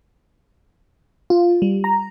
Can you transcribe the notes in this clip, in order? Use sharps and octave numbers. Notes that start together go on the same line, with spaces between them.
F4
G3
A#5